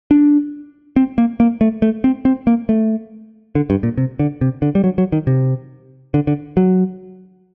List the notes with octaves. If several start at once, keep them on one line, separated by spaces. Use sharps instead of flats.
D4
C4
A#3
A#3
A3
A3
C4
C4
A#3
A3
D3
G2
A#2
C3
D3
C3
D3
G3
F#3
F#3
D#3
C3
D3
D3
F#3